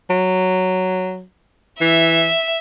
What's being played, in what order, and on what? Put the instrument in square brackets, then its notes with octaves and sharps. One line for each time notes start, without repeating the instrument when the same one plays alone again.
[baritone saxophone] F#3
[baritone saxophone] E3 [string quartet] E5